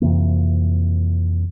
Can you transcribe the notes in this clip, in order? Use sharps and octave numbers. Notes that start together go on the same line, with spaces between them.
F2 C3 E3 A#3